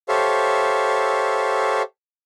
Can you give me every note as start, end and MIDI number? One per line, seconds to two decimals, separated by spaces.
0.09 1.82 67
0.09 1.82 69
0.09 1.82 72
0.09 1.82 73
0.09 1.82 76
0.09 1.82 77